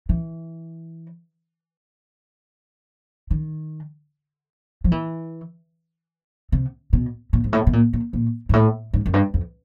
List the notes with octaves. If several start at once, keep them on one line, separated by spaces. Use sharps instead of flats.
E3
D#3
F3
E3
C3
B2
A#2
G#2
A2
B2
A#2
A#2
A#2
G#2
A2
G#2
F#2
G2
F2